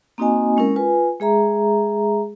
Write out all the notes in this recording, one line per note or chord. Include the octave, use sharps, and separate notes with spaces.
A#3 C4 D#4 F#4 D#5 G#5
G#3 C#4 E4 A#4
F4 B4 G#5
G#3 G#4 E5 A#5